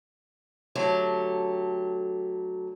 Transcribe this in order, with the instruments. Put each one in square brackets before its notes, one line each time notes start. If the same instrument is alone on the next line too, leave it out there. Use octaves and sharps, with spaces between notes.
[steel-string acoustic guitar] D3 F#3 A3 G4